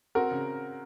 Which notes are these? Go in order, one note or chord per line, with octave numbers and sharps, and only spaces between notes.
C4 F#4 A#4
C#3